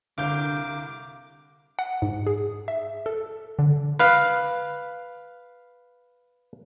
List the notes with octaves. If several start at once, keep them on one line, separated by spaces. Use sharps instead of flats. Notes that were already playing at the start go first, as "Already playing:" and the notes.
C2 D3 F5 D6 G6
F#5
G#2
G#4
E5
A4
D3
B4 F5